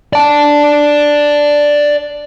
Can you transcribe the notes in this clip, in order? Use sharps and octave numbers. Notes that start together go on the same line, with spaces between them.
D5 A5